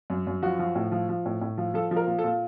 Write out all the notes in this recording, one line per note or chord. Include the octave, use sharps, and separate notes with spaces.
F#2
F#2
F3 F#4
F3
A2
F3
F3
A2
A2
F3
F3 A4
F3
A#4
A#2
A4
A#2